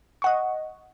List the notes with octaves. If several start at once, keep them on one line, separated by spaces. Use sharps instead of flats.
D#5 F#5 C#6